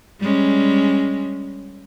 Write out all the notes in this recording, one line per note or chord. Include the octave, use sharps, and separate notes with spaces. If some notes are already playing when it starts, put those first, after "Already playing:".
G3 G#3 C#4